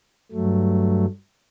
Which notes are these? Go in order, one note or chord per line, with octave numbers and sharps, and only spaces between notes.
G2 F#3 A3